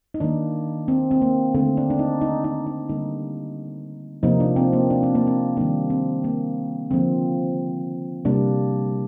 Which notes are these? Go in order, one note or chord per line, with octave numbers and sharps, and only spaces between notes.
D#4
D#3 A#3 D4
C4
C4
A#3
D3 A3 C4
D4
D4
D#4
D#4
D#4
D#4
D3 G3 A#3 D#4
C3 F3 A#3 D#4
D4
C4
A#3
D4
C4
A#3
C4
D#3 G3 A#3 D4
C4
A#3
D3 F3 A#3 C4
C3 G3 A#3 D4